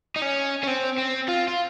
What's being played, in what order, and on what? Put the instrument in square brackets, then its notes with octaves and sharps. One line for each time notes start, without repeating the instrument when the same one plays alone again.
[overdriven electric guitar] D#4
C#4
C#4
C4
C4
F4
F4